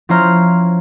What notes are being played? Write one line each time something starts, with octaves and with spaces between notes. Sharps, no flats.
F3 C#4 E4 C5 A#5 F6